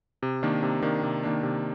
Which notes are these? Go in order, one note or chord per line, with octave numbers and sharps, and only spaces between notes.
C3
D#3 A#3 D4
C3
D#3 A#3 D4
C3
D#3 A#3 D4
C3